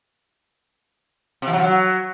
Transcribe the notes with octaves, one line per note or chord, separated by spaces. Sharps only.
C3
F3
F#3
F3
F#3